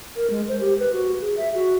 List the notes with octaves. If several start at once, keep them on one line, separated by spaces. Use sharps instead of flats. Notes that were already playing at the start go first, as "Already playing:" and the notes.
A#4
G#3
C5
G4
B4
F#4
G#4
E5
F#4